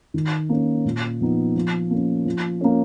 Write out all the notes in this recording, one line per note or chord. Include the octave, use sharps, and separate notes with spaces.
D#3
A#3 C#4
A#2
F3 B3 D#4
F3
A#3 C#4
F3
A#3 C#4